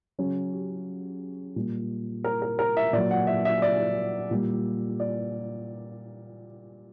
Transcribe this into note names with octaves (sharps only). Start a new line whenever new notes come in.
C#3 F#3 C#4
G4
A#2 G3
A#4
A#4
A#4
E5
A#2 F#3 D5
F#5
E5
E5
D5
A#2 G3
D5